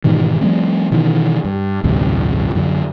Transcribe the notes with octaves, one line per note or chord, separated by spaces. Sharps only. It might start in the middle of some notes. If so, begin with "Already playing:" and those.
G#2 B2 D#3 E3
F3 G3 A3 C4
B2 D#3 E3
G2
A1 D2 G2 C3
F#2 D3